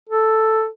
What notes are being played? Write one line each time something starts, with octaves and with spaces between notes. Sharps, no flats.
A4